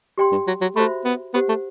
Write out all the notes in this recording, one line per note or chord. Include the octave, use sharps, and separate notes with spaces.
G4 D5 G5 C6
G2
F#3
F#3
A3 F#4 C5 E5 B5
B3
B3 G4 C5 F#5
A3